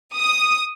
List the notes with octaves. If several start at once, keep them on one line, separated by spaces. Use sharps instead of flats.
D#6